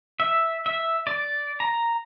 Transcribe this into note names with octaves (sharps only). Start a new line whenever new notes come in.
E5
E5
D5
A#5